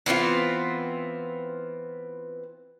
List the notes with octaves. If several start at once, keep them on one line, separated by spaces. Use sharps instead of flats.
E3 B3 C4 F4